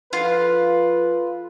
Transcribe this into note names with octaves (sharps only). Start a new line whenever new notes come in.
F3 F4 A4 B4